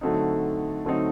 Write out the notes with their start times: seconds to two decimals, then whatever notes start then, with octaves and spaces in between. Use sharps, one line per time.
0.01 D3 F#3 A3 C4 D#4
0.85 D3 F#3 A3 C4 D#4